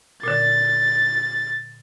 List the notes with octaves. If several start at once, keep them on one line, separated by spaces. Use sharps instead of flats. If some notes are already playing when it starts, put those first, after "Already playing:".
A#2 D3 A6